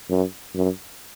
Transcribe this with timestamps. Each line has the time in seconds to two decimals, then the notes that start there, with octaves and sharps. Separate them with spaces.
0.09 F#2
0.55 F#2